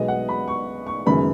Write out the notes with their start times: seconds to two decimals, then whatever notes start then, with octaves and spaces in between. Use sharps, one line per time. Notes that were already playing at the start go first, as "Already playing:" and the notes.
Already playing: B1 B2 G#3 B3 D#5
0.08 F#5
0.29 B5
0.48 C#6
0.87 C#6
1.06 F#1 F#2 D#3 G#3 B3 B5